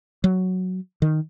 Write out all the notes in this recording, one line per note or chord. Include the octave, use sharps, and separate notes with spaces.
F#3
D#3